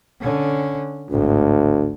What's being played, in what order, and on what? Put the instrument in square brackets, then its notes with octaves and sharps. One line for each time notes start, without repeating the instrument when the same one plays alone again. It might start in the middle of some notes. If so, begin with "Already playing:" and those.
[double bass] D3 C#4
[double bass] G#1 A2 [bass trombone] D2